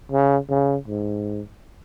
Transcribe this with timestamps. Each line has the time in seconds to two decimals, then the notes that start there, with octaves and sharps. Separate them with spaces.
0.12 C#3
0.50 C#3
0.88 G#2